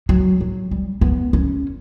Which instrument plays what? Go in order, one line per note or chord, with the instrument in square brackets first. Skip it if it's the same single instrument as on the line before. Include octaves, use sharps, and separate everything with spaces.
[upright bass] F#3
F#3
G3
B3
C#4